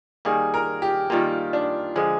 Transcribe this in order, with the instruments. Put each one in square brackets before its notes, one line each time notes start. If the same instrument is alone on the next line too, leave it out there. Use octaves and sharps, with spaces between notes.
[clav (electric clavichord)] D#3 G3 A#3 [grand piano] G#4
[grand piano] A#4
G4
[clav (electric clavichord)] D#3 G3 A#3 [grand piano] F4
[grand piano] D4
[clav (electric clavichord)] D3 F3 G#3 [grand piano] G#4